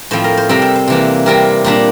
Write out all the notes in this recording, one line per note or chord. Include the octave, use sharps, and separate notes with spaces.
A2 F3 C4 C5
A#4
C5
C3 G3 C4 A#4
A4
C5
C3 E3 A#3
C3 G3 C4 A#4
A#2 G3 A#3 D4